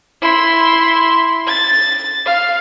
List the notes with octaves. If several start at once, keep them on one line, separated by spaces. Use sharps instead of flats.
E4 C6
A6
F5